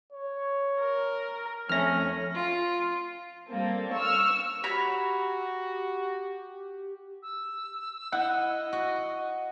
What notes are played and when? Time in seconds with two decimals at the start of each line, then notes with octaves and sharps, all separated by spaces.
0.12 C#5
0.79 A#4
1.69 F2 A3 C#4 E5 F6 A#6
2.35 F4
3.50 G3 A#3 C4 A4
3.93 C#6 E6 F6
4.64 F#4 G4 C#5 A#5 B5
7.22 E6
8.12 E4 D#5 F#5
8.73 F#4